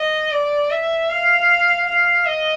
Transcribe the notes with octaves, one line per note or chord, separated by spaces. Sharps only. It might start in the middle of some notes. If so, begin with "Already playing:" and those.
Already playing: D#5
D5
E5
F5
F5
D#5